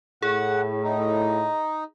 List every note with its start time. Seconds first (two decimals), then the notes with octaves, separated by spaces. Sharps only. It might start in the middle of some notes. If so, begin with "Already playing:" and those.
0.22 A2 G#4 F#5
0.84 D#4